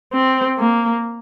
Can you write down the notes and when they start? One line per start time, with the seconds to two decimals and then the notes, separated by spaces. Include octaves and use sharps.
0.13 C4
0.58 A#3